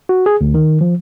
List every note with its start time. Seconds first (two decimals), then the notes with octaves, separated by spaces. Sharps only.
0.09 F#4
0.26 G#4
0.41 D2
0.54 D#3
0.81 F3